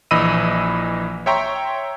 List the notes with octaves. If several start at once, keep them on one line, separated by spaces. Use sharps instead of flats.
A#1 E3 D#5 B5 E6 D#7
C#5 E5 G5 A#5 C6 C#6